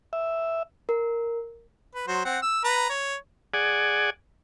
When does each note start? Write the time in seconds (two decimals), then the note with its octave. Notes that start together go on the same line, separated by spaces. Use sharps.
0.13 E5
0.89 A#4
1.95 B4
2.07 F#3 C5
2.25 C4 F#5
2.42 E6
2.64 B4 A#5
2.90 C#5
3.54 G#4 D5 F#5 G#5